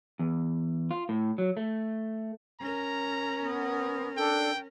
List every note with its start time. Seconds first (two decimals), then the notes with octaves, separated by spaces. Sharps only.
0.19 E2
0.91 F4
1.09 A2
1.38 F#3
1.57 A3
2.60 C#4 A#4 A#5
3.41 B3
4.17 D4 A4 G5